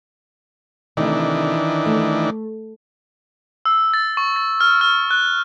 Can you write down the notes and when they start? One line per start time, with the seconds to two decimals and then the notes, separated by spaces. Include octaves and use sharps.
0.97 C3 D#3 E3 A3 D4 D#4
1.86 A3
3.66 E6
3.94 A6
4.17 C#6
4.36 A6
4.61 F6
4.81 F6
5.11 F#6